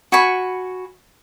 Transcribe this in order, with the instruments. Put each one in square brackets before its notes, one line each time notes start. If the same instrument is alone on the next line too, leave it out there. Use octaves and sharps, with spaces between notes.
[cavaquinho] F#4 G#5 B5 C#6